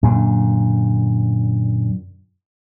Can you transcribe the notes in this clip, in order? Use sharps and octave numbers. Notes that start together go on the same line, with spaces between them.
F#2 A#2 D3